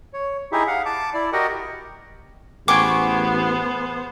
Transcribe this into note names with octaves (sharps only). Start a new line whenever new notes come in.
C#5
D#4 E4 G4 G#4 E5
F5 F#5
A5 D6
E4 D5
F#4 G4 A#4 D#5 F#5 G5
A1 B3 G#4 C5 G5 C#6 D6